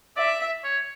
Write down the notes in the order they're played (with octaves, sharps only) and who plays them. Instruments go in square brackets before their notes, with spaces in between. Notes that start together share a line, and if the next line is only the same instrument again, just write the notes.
[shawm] D5 [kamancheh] E5
[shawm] C#5